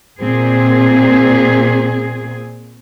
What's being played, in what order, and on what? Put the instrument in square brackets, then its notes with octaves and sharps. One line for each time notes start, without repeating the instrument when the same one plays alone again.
[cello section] A#2 C4 G#4